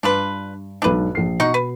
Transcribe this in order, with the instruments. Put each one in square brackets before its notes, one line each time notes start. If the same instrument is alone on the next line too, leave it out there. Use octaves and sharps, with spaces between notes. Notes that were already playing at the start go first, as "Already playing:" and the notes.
[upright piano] G2 [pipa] D4 F4 B4
[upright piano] B1 G#2 [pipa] D4 B4
[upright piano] A#1 C7
[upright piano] B2 [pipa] D#4 F#5 C#6
[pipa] B4